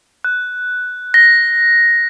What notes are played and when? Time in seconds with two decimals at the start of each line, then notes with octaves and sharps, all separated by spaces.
0.24 F#6
1.14 A#6